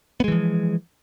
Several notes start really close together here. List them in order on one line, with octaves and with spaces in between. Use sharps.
B3 G#3 E3 F3